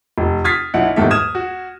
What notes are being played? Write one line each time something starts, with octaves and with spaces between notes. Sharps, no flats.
F1
D#6 F6 G#6 A6 B6 C7
B1 E4 F#5
D#1 E2 G#2 D#3 A4 E5
D#6 F6 G#6 E7
F#4